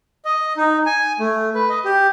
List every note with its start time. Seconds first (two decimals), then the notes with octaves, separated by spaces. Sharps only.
0.25 D#5
0.57 D#4
0.86 G#5
1.19 A3
1.55 B4
1.69 D#5
1.85 G4